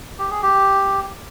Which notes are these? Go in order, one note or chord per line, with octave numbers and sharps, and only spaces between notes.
G4
G#4
G4